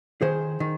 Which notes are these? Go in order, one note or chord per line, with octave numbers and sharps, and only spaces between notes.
D#3 G#4 C5
D#3